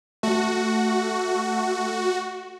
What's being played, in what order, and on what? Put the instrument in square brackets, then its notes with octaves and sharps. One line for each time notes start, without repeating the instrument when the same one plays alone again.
[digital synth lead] A3 [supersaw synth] F#4